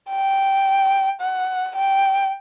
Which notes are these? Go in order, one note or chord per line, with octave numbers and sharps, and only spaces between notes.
G5
F#5
G5